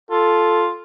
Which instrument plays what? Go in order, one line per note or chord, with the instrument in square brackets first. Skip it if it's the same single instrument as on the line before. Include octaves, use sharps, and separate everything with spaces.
[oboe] F4 [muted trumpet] A4